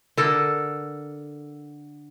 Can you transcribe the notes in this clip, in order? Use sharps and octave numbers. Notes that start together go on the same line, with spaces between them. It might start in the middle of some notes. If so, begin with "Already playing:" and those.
D3 A4 A#4